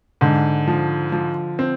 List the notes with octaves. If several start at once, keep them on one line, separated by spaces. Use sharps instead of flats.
G#2 D3
F3
F3
C4